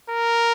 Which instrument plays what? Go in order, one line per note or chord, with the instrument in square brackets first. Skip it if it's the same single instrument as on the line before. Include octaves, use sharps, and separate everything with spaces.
[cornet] A#4